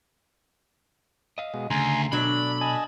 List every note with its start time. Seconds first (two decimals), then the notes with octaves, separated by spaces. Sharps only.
1.38 D#5 F5
1.54 B2 G#3
1.70 D2 C#3 G#5 A#5 C6
2.12 B2 F#3 A3 D4 D5 B5
2.61 D#5 G#5 A5